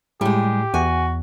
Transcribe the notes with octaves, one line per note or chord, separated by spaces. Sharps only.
A2 G3 G#3 G4
E2 F#4 G#5